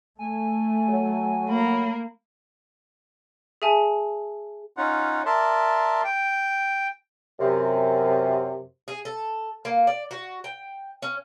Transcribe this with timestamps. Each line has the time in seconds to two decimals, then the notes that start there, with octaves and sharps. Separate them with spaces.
0.19 A3 G#5
0.89 F#3
1.49 A#3 B5
3.62 G#4 E5 G#5 A5
4.77 C#4 D#4 F4 F#5
5.26 A#4 D5 E5 A5 C6
6.04 G5
7.40 F#2 C3
8.88 G#4
9.05 A4
9.65 A#3
9.87 D5
10.11 F#4
10.44 G5
11.02 C#4